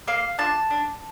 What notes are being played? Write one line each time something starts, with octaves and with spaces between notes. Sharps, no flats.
A#3 F5
D4 F4 A5
D4